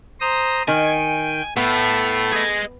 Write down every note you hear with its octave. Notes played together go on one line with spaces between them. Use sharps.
C5 A#5 D#6
D#3 G5 G#5
A2 A3 B3
G#4 D#5